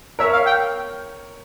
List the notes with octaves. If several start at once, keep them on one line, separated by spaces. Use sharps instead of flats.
A#4 C#5 E5
F5
G5